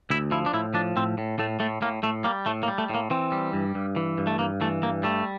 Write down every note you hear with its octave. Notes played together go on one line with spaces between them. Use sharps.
D2 E4
F3 E4
D4
A2 E4
F3 D4
A2 C4
A2
A2 A3
A2 A3
A2 A#3
A2 A3
G3 A#3
A2 A3
A#3
G3
A3
A2 A#3
E3 C4
G3
G2
G2
E3
G2
A3
G2 A#3
E3 A3
G2 A#3
G3 A3